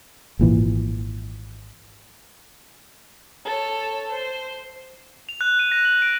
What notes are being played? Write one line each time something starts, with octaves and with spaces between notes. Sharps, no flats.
G#1 A#2 E3
A4 C#5
C5
F7
F#6
D#7
A#6
F#7
D7